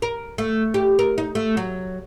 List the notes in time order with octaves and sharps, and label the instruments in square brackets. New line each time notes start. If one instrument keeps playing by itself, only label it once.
[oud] A#4
A3
G4
A#4
D#4
A3
F#3